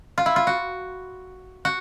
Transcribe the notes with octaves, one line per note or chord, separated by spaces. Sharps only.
F4
E4
F4
F#4
F#4